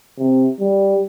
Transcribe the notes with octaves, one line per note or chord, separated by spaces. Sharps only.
C3
G3